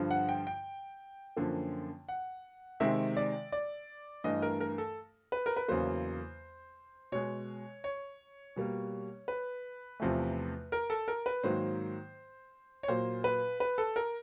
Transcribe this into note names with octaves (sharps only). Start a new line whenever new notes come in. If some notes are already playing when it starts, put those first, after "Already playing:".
Already playing: G2 D3 F3
F#5
G5
G5
F#2 D3 F3 A#3
F#5
C3 D#3 G#3 E5
D5
D5
G2 E3 A3 D#5
A#4
A#4
A4
B4
A#4
B4
E2 C#3 F#3 A#3 C5
B2 G#3 C#5
C#5
B2 G3 A#3
B4
E2 C3 F3 A3
A#4
A4
A#4
B4
G#2 D#3 F#3 A#3 C5
C#5
A#2 F#3 A#3 C5
B4
B4
A4
A#4